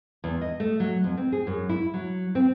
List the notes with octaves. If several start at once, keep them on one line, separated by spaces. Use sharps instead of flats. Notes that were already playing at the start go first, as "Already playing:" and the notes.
E2
D#5
A3
F#3
F2
C4
G#4
F#2
E4
F#3
C4